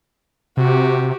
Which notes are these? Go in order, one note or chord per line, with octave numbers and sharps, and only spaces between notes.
C3 F#4 G4